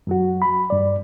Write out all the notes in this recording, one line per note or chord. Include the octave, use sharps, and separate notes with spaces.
F#2 F#3 F#4
B5
G2 D5